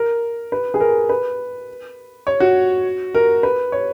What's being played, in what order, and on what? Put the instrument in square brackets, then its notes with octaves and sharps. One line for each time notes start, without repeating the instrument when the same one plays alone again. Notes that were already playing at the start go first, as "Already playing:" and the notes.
Already playing: [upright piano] A#4
B4
G#4
A#4
B4
C#5
F#4
A#4
B4
C#5